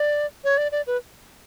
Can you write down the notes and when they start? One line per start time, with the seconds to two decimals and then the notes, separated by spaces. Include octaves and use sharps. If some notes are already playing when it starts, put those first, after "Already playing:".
Already playing: D5
0.44 C#5
0.58 D5
0.72 D5
0.87 B4